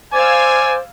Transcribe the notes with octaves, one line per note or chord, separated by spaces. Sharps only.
C5 D5 F5 G#5 E6 G#6